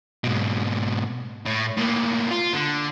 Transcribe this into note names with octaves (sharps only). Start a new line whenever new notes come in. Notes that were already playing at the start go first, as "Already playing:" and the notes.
G#2 B2
A2
A2 A#3
F4
D3